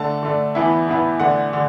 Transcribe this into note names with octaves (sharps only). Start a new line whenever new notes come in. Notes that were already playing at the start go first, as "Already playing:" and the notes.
Already playing: D3 A3 D4 A5
D3 A3 D4
E2 E3 B3 E4
E2 E3 B3 E4
E2 D3 A3 D4 F#5
D3